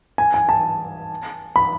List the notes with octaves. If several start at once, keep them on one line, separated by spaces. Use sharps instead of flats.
G#5
G#5
A5
B5